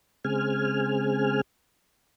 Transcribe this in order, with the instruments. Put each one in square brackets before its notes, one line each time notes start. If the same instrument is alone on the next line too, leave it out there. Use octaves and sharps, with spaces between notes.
[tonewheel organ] C#3 G#3 C4 G#4 G#5 F6